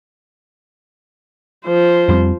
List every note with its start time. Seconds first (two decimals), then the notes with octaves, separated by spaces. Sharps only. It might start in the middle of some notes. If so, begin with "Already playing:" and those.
1.66 F3 C5
2.09 F2 G3 C4